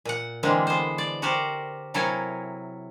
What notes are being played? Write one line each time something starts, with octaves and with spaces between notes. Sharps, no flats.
A#2 F#5
D3 E3 G#3 A#3 C4 D4
B3 C5
D5
F#4 G4 A#4 C5 D5
C3 F#3 E4 A4 A#4 G#5